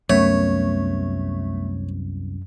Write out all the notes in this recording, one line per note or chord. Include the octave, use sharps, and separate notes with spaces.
C2 F#2 A3 B3 C#5